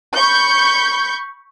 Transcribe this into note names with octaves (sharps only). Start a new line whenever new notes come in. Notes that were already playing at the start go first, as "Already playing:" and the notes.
B5 C#6 G6